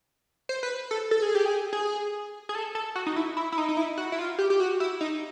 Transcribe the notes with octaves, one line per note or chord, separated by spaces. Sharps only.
C5
B4
A4
A4
G#4
G4
G#4
G#4
G#4
A4
A4
F#4
D#4
E4
E4
E4
D#4
D#4
E4
F#4
E4
F4
G4
G4
F#4
E4
D#4